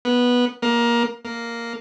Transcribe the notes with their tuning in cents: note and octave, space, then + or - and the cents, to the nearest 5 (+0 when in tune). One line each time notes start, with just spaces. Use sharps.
B3 -10
A#3 +20
A#3 +0